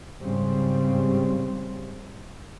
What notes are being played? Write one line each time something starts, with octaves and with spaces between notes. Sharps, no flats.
G#2 C#3 G3 C4